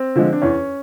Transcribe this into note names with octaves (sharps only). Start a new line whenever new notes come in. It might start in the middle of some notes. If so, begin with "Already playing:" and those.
Already playing: C4
D3 F3 G#3
D4
E2 C#4